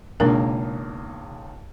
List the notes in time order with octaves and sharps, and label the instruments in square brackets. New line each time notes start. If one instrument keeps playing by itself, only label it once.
[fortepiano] G#1 C#2 A#3 [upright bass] B2 [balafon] D4 A#4